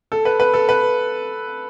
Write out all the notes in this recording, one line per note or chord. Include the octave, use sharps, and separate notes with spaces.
A4
B4
B4
A4
B4